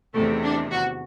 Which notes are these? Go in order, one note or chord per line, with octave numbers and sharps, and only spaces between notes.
E2 C3 D#3 A3
D4
F#4